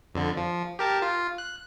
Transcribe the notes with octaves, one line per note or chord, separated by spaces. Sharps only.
F2 D3
F3
G4 A#4 A5
F4
F#6